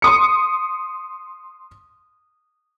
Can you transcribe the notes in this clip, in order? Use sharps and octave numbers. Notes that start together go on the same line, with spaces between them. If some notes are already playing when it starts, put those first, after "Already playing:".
C6 D#6 C#7